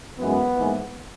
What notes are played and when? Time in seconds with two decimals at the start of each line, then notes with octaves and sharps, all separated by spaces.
0.19 F#2 E3 G#3 B3
0.55 G#2 E3 A#3